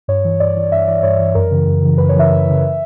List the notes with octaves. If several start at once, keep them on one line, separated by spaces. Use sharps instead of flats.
G2 C#5
E3
G2 D5
E3
G2 E5
E3 D5
G2 C#5
E3
F#2 A#4
C#3 E3
F#2
C#3 E3
F#2 B4
C#5
C#3 E3 E5
F#2
C#3 E3